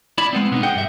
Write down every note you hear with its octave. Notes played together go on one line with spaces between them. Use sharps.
E4 D5 A5 B5
G#3 B3 C4
B2 B3 D4 D#4
G#4 D#5 F#5 G5
G2 E5